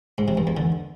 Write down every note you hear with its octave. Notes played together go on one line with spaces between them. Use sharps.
G#2
C3
G2
E2
D3